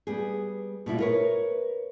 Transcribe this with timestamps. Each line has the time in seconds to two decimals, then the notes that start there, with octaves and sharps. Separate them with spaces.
0.07 G3 B3 G#4
0.86 B2 G3 E4 F4
1.00 A#4 B4 C#5